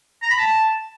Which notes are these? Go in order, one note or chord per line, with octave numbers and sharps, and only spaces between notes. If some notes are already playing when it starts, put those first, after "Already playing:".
A#5
B5
A5